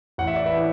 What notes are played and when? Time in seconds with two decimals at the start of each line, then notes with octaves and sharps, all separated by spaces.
0.18 A1 F#5
0.27 E5
0.36 D5
0.46 B4 E5
0.52 A2 E3